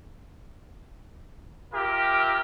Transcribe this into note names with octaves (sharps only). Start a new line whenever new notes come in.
F4 G4 A#4 E5